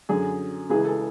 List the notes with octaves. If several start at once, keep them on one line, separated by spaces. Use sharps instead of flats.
F#2 D3 G#4
C#2 C#3 E3 G#4
A4